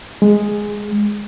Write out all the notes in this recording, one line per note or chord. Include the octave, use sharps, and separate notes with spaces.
G#3